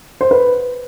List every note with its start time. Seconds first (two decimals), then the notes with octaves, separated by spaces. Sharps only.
0.21 C5
0.31 B4